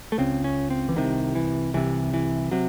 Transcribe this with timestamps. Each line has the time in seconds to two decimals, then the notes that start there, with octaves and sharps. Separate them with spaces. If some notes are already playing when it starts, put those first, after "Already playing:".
0.12 A3
0.18 C#2 C#3 C4
0.44 C#4
0.70 C4
0.89 E3
0.96 C2 C3 D#3
1.35 E3
1.74 C2 C3 E3
2.14 E3
2.51 C3 F#3